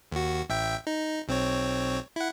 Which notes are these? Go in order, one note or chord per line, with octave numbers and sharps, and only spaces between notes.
D#2 F#4
A1 E5 G5
D#4
B1 C4 C#5
E4 F#5